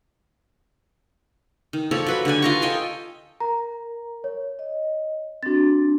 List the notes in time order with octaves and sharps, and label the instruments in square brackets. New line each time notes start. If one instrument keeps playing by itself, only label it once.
[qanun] D#3
F3 A4 C#5 D5
F#3 B4 B5
D3 G4 D5 G#5
F4 A#5 C#6
A4 D#5 G5 G#5
[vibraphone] A#4 [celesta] A#5
[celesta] C#5
[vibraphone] D#5
[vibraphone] C4 D4 [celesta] F#4 A6